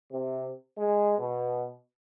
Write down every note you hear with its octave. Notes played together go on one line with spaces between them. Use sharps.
C3
G#3
B2